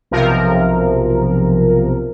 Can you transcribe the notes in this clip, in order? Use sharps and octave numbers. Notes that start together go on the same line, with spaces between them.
B1 C3 F3 A#4